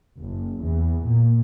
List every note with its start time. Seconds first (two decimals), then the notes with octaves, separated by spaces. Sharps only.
0.17 F#1
0.62 E2
1.04 A#2